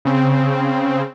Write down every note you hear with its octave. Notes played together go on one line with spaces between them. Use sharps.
C#3 C4